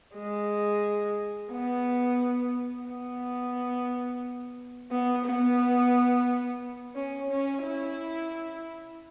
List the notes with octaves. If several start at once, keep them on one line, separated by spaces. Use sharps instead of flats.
G#3
B3
B3
B3
B3
C#4
C#4
E4